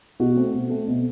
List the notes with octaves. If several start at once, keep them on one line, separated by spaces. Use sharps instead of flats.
B2 F#4
A3 C4
B2
A3 C4
B2